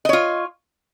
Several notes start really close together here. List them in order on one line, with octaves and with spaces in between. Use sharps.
D#5 C#5 F4